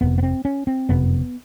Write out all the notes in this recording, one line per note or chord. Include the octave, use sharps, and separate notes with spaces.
F#1 F2 C3 B3
B3
C4
C#4
C4
F#1 F2 C3 B3